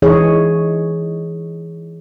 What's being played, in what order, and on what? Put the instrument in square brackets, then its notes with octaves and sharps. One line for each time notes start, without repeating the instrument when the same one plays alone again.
[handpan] E3 D#4 G#4 C#5